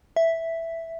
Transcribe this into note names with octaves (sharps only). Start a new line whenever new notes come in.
E5